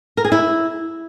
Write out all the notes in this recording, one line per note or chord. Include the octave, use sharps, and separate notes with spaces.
A#4
G#4
E4